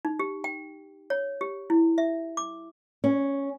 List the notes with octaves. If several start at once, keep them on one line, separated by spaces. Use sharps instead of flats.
D#4
G4
G5
C#5
G4
E4
E5
D6
C#4